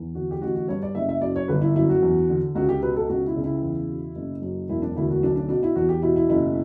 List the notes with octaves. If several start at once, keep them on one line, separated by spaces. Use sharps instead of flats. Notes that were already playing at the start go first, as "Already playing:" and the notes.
Already playing: E2
D3 F#4
G4
A1 F#4
F#4
G2 C#5
D5
F#1 E5
E5
F#2 D5
C#5
G1 B4
E4
F#2 E4
F#4
E2
D3
C#2 F#4
G4
B2 B4
A4
C#2 F#4
E4
C#3
E4
E2
B2
F#1
F#2
E1 E4
D4
D2 E4
F#4
B1 D4
D4
B2 D4
E4
E2 F#4
G4
B2 E4
E4
F#1 E4